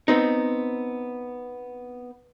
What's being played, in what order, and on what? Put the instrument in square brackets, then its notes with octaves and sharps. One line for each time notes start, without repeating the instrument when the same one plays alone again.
[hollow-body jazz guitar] B3 C4 D#4